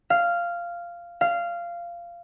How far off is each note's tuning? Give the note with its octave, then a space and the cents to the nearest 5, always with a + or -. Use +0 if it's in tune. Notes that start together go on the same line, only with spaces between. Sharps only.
F5 -10
F5 -15